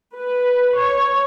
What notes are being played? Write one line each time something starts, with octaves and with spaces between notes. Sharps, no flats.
B4
C#5